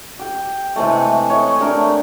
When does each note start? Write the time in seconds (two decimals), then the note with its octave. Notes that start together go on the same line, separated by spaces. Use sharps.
0.19 G4 G5
0.76 C3 E3 G#3 A3
1.30 C#5 D#5
1.60 A3 D4 G4 A#4